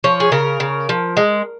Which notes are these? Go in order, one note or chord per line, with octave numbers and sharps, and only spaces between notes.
F3 C#5
G#4
C#3 A#4
C#3
F3
G#3